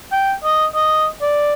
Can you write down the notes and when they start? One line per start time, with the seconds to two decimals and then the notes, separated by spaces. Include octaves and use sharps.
0.12 G5
0.44 D#5
0.75 D#5
1.22 D5